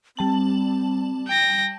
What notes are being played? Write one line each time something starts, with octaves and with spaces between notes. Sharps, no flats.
G3 C4 A5 F#7
G5 A#6